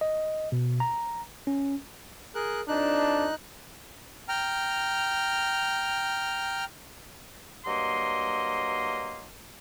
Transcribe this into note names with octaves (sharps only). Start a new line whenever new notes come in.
D#5
B2
A#5
C#4
G#4 A#4 F#6
F2 D4 D#4 F#6
G5 A#5 F6
G2 F#3 A#3 D#5 C6